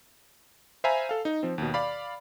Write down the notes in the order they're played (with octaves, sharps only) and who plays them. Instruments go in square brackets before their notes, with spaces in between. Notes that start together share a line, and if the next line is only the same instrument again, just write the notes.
[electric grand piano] C5 E5 F5 G#5 A#5 B5
A4 F5
D#4
F3 C4
D#2 B2
D5 F5 B5